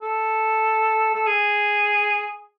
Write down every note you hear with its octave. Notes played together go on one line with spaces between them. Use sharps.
A4
A4
G#4